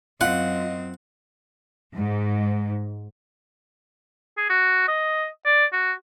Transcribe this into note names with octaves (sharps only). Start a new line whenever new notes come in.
F#2 C4 F4 D#5 F#5
G#2
G#4
F#4
D#5
D5
F#4